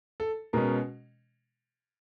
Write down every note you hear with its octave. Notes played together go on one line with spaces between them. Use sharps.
A4
B2 G#3 C#4 A#4